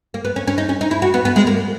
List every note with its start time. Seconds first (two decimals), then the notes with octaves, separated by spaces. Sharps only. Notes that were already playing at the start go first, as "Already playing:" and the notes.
0.14 A#3
0.25 B3
0.36 C#4
0.47 C#4
0.58 D#4
0.69 C#4
0.81 D#4
0.91 E4
1.02 F#4
1.14 B3
1.25 B3
1.36 G#3
1.47 A#3